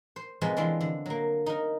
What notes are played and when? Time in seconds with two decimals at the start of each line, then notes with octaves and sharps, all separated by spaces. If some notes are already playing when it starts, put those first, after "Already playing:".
0.16 C5
0.41 C3 F3 G#3 A3 B3 B4
0.57 E3 G#3 B3 C4 D4 F4
0.81 D3
1.06 F#3 A#3
1.46 D#4 A#4